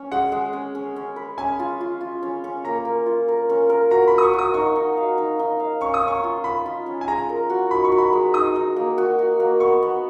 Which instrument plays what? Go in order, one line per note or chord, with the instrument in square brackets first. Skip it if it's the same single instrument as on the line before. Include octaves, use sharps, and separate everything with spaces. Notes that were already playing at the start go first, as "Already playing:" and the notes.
Already playing: [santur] C#4
[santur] G#3 [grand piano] F#5
[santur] G#3
C#4
C#4
C#4
B4
[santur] C#4 [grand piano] G#5
[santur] F4
F4
F4
C#4
C#4
[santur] A#3 [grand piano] A#5
[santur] A#3
F4
A#4
C#4
A#4
[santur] F#4 [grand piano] A#5
[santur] A#4 [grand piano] B5
[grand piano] D#6
C#6
[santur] F#4
[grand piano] D#6
[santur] D#4 [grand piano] C#6
[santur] D#4
F5
D#4
D#4
F5
[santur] C#4 [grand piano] C#6
[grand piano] D#6
[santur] C#4
[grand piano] C#6
[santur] F4
[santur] B4 [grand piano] B5
[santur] F4
C#4
[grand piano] G#5
[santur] G#3 [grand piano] A#5
[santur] A#4
F#4
[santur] D#4 [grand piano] B5
[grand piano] C#6
[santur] F#4
[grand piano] B5
[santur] G#3
[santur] D#4 [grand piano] D#6
[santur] D#4
A#3
F#4
F#4
A#3
[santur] B3 [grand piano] C#6
[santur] B3